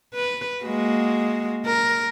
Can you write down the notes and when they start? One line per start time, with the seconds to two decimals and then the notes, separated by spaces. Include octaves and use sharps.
0.15 B4
0.64 G#3 A#3 F#4
1.66 A#4